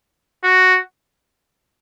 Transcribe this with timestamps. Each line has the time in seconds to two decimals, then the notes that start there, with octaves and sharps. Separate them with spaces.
0.44 F#4